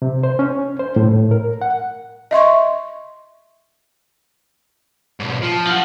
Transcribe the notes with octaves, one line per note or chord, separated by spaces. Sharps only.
C3
C5
C#4
C5
A2
A#4
F#5
D#5 E5 C6 C#6
G#2 B2
F3
F4 F#5